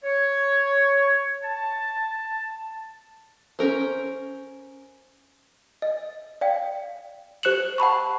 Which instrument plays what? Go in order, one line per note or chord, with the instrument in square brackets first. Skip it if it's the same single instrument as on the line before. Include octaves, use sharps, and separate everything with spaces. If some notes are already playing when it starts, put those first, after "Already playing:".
[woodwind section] C#5
A5
[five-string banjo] C#4 A#4 C5
[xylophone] D#5
D5 F5 G5
G4 C5 F#6 C#7 E7 F#7
F#5 A5 B5 C#6